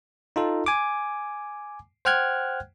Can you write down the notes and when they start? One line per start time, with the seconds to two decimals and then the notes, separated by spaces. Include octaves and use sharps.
0.36 D#4 F4 A4
0.66 G#5 D6
2.05 C5 F#5 G5 F6 F#6 G#6